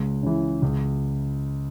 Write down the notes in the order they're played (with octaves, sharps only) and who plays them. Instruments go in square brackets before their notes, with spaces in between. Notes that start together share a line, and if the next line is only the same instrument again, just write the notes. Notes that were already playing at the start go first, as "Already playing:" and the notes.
Already playing: [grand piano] C#2
C#3 E3
C#2